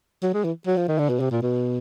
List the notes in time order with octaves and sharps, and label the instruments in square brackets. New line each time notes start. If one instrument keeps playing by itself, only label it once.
[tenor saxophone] F#3
G#3
E3
F#3
F3
D#3
D3
B2
C3
A#2
B2